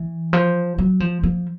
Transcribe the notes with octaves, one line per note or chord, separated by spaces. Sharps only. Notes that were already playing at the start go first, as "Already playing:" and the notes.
Already playing: E3
F3
F#3
F3
F3